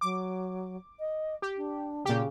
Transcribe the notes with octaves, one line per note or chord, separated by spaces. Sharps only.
F#3 D6
D#5
G4
D4
A#2 C#3 G4